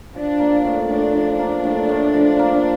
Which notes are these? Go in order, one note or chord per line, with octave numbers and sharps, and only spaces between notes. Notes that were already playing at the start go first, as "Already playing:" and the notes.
F3 D4
A#3
A2
A2 D4
F3
A#3
A2
A2
F3
A#3